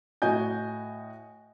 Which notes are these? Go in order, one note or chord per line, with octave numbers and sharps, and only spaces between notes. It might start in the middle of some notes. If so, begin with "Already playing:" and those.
A2 F#4 D#5 G#5 G6